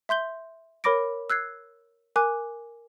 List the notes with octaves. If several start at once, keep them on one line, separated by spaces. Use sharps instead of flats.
E5 C6 G6 G7
A#4 C#5 B5 D6 A#6 D7
E6 F#6 G#6 C7
A#4 G#5 D6 F#6